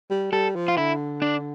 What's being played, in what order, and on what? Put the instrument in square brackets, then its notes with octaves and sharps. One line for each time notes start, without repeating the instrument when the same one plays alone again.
[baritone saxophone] G3
[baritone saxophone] G3 [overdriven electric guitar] A4
[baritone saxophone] F3
[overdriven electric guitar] F4
[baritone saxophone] D3 [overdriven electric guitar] E4
[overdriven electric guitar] D4